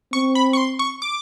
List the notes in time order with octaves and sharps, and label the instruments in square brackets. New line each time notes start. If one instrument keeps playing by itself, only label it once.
[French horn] C4 [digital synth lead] C#6
[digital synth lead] B5
C#6
C6
C#6
D6